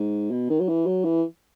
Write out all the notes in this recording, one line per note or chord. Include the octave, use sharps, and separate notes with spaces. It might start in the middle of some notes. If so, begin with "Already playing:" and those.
Already playing: G#2
B2
D#3
F#3
E3
F#3
E3